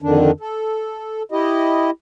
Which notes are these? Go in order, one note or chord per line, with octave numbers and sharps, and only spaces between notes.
F2 D3 D#3 D4
A4
E4 G4 D#5